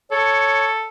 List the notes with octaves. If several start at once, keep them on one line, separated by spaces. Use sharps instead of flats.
A4 C#5